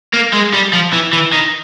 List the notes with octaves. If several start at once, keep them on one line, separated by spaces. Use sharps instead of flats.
A#3
G#3
G3
F3
E3
E3
D#3